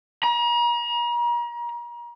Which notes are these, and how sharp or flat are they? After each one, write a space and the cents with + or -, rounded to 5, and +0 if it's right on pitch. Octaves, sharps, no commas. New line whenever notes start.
A#5 +40